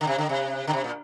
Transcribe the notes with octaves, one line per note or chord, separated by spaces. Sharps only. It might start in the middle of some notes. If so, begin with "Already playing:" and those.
D3
C3
D3
C3
D3
C3
A#2